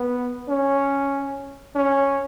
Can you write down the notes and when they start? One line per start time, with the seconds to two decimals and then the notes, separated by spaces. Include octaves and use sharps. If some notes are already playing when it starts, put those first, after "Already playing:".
Already playing: B3
0.49 C#4
1.76 C#4